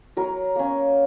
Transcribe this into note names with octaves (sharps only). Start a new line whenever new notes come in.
F#3 A#4
A#3 C#4